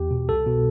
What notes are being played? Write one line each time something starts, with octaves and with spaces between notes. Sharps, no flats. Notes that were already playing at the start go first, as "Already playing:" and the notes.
Already playing: E2 G4
B2
C2 A4
B2